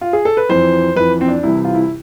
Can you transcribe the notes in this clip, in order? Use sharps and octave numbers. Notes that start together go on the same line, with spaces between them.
F4
G#4
A4
B4
F2 E3 C5
F2 E3 B4
C4
D4
C2 C3 E3 E4
F4
E4